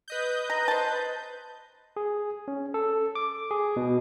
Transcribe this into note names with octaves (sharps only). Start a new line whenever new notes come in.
B4 D#5 G6
A#5
C5 A5
G#4
C#4
A4
D6
G#4
B2